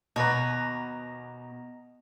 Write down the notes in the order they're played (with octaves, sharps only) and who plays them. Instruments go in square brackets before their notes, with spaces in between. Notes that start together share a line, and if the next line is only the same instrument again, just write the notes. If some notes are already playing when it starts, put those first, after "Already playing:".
[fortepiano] D#2 B4 [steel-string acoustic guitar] B2 [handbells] D#5 A#5 A#6